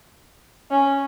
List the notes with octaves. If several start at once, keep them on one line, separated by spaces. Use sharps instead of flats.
C#4